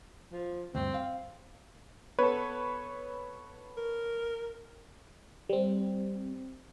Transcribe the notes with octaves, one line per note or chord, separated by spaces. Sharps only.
F3
D2 G2 C4
F5
B3 A4 B4 C#5
A#4
G3 C4